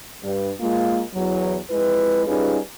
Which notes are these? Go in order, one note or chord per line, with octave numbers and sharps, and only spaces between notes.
G2
G#3 A#3 F4
E2 F#3
F2 G#3 E4 B4
G3 C#4 D#4 F4 G#4 B4